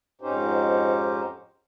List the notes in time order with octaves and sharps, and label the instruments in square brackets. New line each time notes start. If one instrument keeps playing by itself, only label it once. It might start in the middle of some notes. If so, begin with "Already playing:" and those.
[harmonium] F2 G#2 C#4 D#4 G4 C5